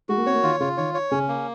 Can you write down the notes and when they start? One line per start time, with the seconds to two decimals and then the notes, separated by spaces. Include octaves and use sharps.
0.09 G#3 F#4
0.18 A#3
0.26 C4 C#5
0.35 A#3
0.43 D#3 F4
0.60 C#3 F4
0.77 D#3 C#5
0.94 C#5
1.11 C#3 C#4
1.28 A#3